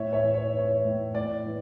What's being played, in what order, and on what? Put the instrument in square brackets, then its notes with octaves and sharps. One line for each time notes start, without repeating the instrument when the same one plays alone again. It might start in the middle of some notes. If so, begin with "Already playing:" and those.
Already playing: [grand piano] A2 C#5 E5
C#5 E5
E3
C#5
E3 C#5
A2
A2 D5
E3